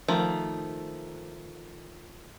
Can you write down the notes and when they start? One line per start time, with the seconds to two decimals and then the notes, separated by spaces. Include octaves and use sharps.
0.08 D#3 F3 A3